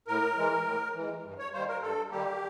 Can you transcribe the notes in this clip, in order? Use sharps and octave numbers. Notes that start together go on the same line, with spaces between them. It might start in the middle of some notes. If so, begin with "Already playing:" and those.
A2 A#4
E3 G#3
A2
E3 G#3
G2
C#5
D#3 G3 A#3 C5
A#4
G2 A4
D#3 G3 A#3 G4